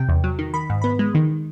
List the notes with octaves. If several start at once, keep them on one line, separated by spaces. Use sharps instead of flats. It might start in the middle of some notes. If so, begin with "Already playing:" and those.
Already playing: C3 G5
E2
F#3
D#3
D#3 B5
G#2
B3 B5
G#3
D#3